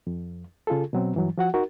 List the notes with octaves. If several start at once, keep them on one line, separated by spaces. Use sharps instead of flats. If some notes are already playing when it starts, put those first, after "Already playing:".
F2
C#3 F4 G#4 A4
B2 F#3 C4
G2 E3 F#3
F3 F#4 F#5
D#4 F#4 A#4